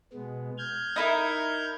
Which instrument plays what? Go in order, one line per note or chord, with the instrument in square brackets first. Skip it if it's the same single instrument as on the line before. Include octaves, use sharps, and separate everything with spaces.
[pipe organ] B2 G#3 B3
F6 G6 G#6
[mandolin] D#4 E4 A#4